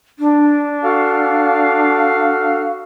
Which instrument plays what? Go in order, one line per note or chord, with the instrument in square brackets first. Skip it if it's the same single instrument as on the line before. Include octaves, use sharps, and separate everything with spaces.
[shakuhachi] D4
[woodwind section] F#4 A4 F5